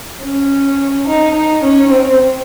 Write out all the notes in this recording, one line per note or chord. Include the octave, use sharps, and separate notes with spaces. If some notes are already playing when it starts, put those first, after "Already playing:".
C#4
D#4
D#4
C#4
C4